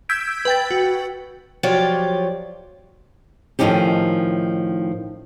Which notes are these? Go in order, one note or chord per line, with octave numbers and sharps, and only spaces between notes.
E6 G6 G#6 B6 D7
B4 G5 A6
F#4
F3 F#3 F4 G4 C#5 D5
A2 D#3 F3 C#4 D#4 G4